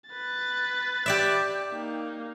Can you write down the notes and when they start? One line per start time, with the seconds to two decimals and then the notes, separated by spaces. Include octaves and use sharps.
0.10 B4 A6
1.06 G4 D5 E5
1.72 A#3 D#4